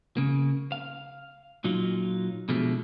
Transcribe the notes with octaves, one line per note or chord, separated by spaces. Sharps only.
C#3 A#3
F5
A#2 F#3 D#4 F4
B2 D3 F3 G#3 A3